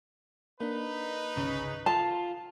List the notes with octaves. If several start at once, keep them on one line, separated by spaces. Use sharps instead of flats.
A#3 D4 D#4 B4
G1 C2 C#3 C#4
F4 A4 A5